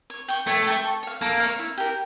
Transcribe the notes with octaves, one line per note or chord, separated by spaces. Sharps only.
C#5
G5 C#6
A3 C#5
G5 C#6
A4
C#5 F5
A#3 A4
C#5 F5
E4
G4 A#4